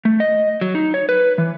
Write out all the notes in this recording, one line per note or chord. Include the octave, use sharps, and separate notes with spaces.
A3
D#5
F#3
D#4
C#5
B4
E3